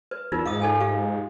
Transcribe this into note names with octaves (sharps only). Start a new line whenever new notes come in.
B4
E2 D#4 F4 A#4
G#2 F5 D#6
D#4 A4 G#5
G4 F5